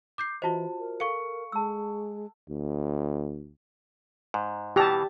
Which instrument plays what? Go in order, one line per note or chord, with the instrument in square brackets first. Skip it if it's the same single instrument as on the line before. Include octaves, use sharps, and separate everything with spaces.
[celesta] D6 G6 C7
[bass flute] E3 [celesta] F4 F#4 C5 [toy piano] D#5 A5
[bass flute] A#4
[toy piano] A4 F5 [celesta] C#6 C#7
[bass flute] G#3 [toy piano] A5 E6
[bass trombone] D2
[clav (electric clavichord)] G#2
[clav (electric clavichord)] B2 E3 A#5 [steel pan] G4 A5